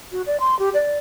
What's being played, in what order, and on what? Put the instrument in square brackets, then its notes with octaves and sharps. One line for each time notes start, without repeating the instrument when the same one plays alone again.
[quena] F#4
D5
C6
G4
D5